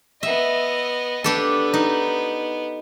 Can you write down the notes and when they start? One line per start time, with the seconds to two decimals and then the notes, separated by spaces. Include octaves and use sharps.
0.23 B3 D#5 E5
1.24 B3 D4 G4 A4
1.74 D#4